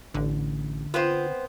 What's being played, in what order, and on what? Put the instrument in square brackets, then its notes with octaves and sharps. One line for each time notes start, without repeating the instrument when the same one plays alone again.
[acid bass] A1 [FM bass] D3
[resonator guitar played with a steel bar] B3 C4 C5 [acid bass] F4